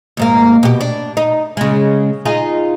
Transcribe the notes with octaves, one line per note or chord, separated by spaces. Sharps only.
D#2 G#2 A#3
B2 G4
D4
D#4
C#3 G#3
D#4 F4 G#4